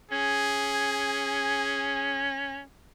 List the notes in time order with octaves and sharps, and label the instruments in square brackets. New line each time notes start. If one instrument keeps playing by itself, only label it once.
[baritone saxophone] C#4 [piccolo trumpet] G#4